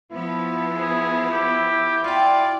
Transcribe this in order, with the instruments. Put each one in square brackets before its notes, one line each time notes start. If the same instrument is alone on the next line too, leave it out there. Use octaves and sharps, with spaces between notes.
[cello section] F3 B3 [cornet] E4
[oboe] G#4
G4
[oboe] F4 [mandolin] F#4 G5 [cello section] D5